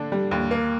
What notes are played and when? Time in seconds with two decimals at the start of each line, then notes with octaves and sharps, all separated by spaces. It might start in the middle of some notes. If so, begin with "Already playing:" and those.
Already playing: D3 D4
0.12 G3
0.31 D#2
0.51 A#3